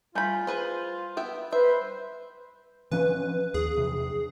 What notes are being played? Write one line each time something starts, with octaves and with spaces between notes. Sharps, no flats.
G3 A3 F4 G#5 B5 G6
G#4 B4 C5
B3 E5 G5
B4 C5 E5
E3 F3 C#4 B4
D#2 G#4
E2 C3